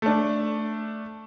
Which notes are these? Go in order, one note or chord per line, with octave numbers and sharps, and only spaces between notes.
A3 D4